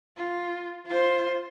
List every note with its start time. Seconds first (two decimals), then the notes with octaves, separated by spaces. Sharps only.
0.17 F4
0.86 F4 C5